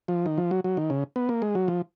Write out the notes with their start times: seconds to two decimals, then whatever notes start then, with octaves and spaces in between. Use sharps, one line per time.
0.08 F3
0.26 D#3
0.38 F3
0.51 F#3
0.64 F#3
0.77 D#3
0.90 C#3
1.16 B3
1.29 A#3
1.42 G#3
1.55 F#3
1.68 F3